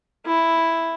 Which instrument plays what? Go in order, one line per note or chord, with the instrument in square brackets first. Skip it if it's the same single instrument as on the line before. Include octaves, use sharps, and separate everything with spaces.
[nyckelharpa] E4